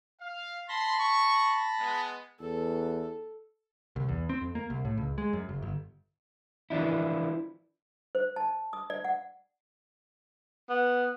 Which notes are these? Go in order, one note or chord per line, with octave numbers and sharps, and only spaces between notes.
F5
A5 B5 C6 A#6
C#6
G#3 B3
E2 A4
C2
E2
C4
F2
A#3
C2
A2
C#2
G#3
F#2
F#1
G1
E3 F3 D4 E4
C5
A5
D#6
D5
F#5
B3